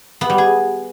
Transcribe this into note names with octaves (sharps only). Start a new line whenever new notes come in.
B3
G3
G#4